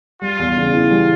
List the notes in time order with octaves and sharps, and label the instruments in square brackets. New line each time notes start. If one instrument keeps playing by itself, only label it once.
[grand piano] G3 [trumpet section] F4
[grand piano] E2
C#3
E3
G3